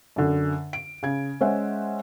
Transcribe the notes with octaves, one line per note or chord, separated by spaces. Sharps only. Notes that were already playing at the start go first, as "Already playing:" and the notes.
F#2 D3
D7
C#3 G#6
G#3 C#4 C5 E5 F#5